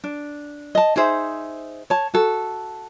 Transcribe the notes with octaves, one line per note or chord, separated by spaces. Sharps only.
D4
D#5 A5
D#4 G#4 C5 E5
C#5 A5
F#4 A4